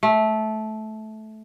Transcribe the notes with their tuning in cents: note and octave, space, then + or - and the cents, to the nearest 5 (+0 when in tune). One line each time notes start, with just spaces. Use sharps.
A3 -15